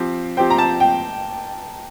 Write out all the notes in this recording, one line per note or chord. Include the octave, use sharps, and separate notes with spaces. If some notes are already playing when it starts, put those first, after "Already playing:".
Already playing: F3 C4 G4
F3 C4 G4 C5 G5
A#5
A5
G5